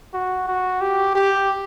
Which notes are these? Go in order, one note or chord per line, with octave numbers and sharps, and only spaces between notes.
F#4
F#4
G4
G4